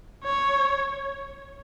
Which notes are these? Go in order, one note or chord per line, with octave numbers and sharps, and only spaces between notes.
C#5